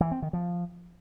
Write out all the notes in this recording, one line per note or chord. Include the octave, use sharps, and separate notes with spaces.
E3
C4
D#3
F3